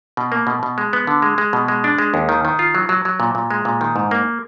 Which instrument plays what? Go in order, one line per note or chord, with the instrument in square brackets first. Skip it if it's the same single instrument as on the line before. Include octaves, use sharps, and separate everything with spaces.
[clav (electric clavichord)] B2
A#3
B2
B2
G#3
B3
D3
G#3
G#3
B2
G#3
D4
G#3
D#2
D#3
D#3
F4
F#3
F#3
F#3
A#2
A#2
G#3
A#2
D#3
G#2
A#3